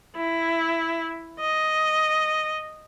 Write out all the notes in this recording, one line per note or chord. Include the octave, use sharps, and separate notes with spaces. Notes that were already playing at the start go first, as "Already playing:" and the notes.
E4
D#5